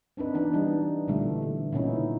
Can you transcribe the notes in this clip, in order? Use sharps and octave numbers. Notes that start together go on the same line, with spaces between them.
C4 D4 D#4 B4
E3 B3 D4
G3 D4 D#4
A#2 D3 E3 G3 A3 B3
D3
A#2 C#3 B3 C#4 D#4 E4